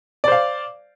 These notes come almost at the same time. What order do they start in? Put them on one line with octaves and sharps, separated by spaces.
D5 C5 F5